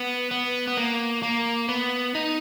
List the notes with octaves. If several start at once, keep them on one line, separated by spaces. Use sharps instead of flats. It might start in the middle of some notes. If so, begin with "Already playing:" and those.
Already playing: B3
B3
B3
A#3
A#3
B3
D#4